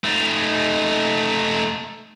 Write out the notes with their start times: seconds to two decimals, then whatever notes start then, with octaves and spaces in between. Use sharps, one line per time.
0.04 A3 D#4